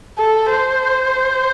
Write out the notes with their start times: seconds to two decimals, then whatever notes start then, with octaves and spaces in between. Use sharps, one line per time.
0.18 A4
0.51 C5